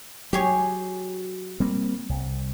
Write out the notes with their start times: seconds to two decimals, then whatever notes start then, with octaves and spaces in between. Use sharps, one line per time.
0.33 F#3 G4 G#4 C#5
1.60 G3 A#3 C4
2.09 C2